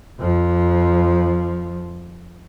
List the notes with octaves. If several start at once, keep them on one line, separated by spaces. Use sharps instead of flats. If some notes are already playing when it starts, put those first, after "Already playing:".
F2 F3